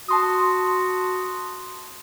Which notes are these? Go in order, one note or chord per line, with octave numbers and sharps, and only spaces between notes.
F#4 A5 C6 D#6